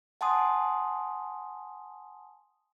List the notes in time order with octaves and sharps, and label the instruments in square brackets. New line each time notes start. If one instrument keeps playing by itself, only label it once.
[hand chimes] F#5 G#5 A5 C6 D#6